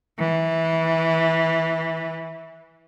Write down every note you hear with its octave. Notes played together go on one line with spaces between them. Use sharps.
E3